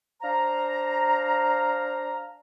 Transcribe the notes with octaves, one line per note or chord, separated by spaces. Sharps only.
D4 C5 F5 A#5